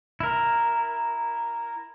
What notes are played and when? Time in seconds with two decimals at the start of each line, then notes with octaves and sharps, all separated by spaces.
0.20 E4 A#4